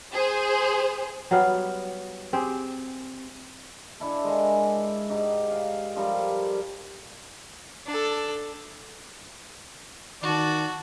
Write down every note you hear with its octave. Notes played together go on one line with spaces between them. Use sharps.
G#4 C5
F#3 G3 B3 F5
C4 G4 G#4
D4 E4 A4
G#3 A#4 G#5
G#2 D#4 G4
F5
F3 G3 A4 A#4
D4 A4
D#3 F#4 D5 A5